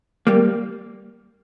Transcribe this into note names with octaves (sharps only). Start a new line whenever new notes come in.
G3 A#3